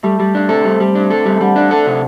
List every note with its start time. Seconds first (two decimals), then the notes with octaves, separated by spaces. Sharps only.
0.03 G3 A3
0.20 G3
0.35 D4
0.49 C3 A4
0.65 G3
0.80 G3
0.95 D4
1.10 A4
1.26 G3
1.35 E3
1.41 D3 G3
1.56 D4
1.71 A4
1.87 C3